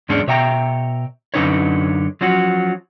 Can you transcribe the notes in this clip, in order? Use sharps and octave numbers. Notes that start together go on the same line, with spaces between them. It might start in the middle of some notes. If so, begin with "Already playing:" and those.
E2 G#2 G#3 C#4 D4
B2 C#5 E5 G5 A#5
F#2 D3 C#4 D#4 B4 C#5
F3 F#3 C#4 F#4